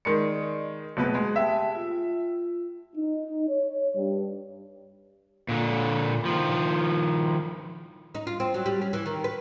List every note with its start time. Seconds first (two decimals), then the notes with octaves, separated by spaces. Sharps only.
0.05 D#3 G#3 D5 D#5 C#7
0.97 F#1 B2 A3 C4 B4
1.15 G#3 G#4
1.36 G4 E5 G5 A5
1.75 F4
2.96 D#4
3.48 C#5
3.94 G2
5.49 A#2 D3
6.25 D#3 F3
8.15 D#4
8.27 F4
8.40 C4
8.54 F#3
8.66 G3
8.82 C#4
8.93 E3
9.06 D#3
9.24 B4